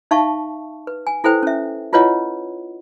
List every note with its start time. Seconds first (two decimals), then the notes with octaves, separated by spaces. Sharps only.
0.11 D#4 E5 F5 A5 C#6
0.87 B4
1.07 G#5
1.24 E4 A4 B4 C5 G5
1.43 C#4 E5
1.93 E4 F4 B4 C#5 D#5 F#5